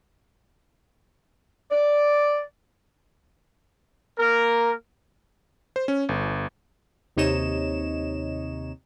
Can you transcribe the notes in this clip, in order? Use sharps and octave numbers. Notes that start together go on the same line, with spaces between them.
D5
A#3 A#4
C5
C#4
G1
D#2 C3 D#4 C#5 D#5 E7